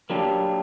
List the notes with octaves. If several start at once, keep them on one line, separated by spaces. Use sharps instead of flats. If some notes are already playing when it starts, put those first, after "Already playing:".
F#3 A#3 D4 G4